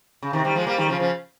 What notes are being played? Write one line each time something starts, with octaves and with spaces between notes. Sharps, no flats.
C#3
C3 D#3
D#3 G3
F3 G#3
G3 A#3
D#3 G3
C#3 F3
C#3 F3